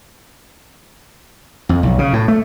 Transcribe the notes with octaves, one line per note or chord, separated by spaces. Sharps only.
F2
B1
C#3
A2
A3